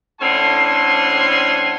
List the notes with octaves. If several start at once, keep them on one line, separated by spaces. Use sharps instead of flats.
A2 D3 C4 C#4 G#5 C6